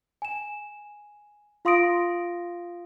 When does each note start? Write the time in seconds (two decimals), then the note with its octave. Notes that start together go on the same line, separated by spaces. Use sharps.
0.22 G#5 E7
1.65 F4 F5 C6 D#6 A#6 D7